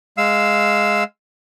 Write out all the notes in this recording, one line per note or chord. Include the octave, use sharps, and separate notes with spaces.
G#3 F5 E6